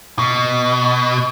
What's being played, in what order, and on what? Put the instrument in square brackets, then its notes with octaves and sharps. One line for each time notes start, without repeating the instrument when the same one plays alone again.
[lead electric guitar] B2